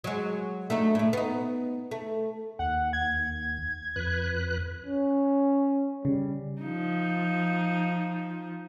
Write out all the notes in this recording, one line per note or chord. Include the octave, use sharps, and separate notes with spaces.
F#3 G#3
A3 D4 D#4
A2 A3
B3 D#4
A3
D#2 F#5
G#6
F2 B4 F#6
C#4
C#3 G3
F3 D#4